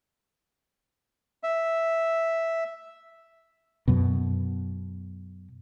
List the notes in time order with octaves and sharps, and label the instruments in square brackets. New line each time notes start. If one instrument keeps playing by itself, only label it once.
[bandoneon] E5
[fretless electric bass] F#2 B2